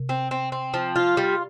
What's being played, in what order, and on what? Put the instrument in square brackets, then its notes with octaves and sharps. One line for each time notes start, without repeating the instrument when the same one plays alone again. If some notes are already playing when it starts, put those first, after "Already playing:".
Already playing: [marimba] C3
[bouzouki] C4
C4
C4
F3
F4
G3